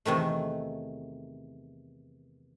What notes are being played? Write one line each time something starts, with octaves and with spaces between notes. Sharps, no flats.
E2 C3 D#3 A3